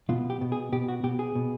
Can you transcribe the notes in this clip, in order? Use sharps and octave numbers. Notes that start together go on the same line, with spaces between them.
B2 F4
G4
B2
G#4
B2 G4
F#4
B2 G4
G#4
B2